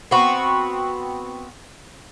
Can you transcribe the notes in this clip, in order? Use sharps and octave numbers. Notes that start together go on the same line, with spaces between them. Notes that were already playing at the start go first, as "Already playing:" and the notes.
B3 C4 F#4